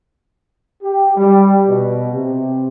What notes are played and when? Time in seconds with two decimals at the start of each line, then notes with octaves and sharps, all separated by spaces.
0.82 G4
1.16 G3
1.68 B2
2.13 C3